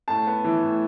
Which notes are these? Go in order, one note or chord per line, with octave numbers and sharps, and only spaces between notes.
A2 A5
B3
E3
A2